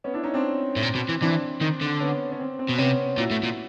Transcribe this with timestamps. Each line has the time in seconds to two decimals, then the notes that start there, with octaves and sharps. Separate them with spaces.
0.04 B3 C#4
0.14 D4 E4
0.23 C#4 D#4
0.34 C4 D4
0.76 A2
0.82 A#2
0.95 B2
1.09 E3
1.22 E3 C4 D4
1.61 D#3
1.81 D3
2.00 B3 C#4
2.32 C#4
2.40 C4
2.59 C4
2.69 B2
2.78 C3 B3 C#4
3.18 A#2 E4 F#4
3.31 A2
3.44 A#2